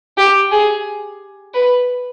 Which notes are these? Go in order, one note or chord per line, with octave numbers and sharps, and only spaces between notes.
G4
G#4
B4